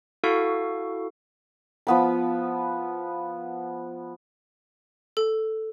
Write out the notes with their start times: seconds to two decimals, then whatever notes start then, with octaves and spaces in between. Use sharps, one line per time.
0.24 E4 F#4 A4 F5 C#6
1.87 F3 B3 B5
5.17 A4